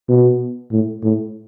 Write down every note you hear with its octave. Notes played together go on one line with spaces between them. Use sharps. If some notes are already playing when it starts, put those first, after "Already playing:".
B2
A2
A2